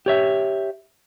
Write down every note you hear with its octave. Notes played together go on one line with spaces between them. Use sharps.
G4 C#5 E5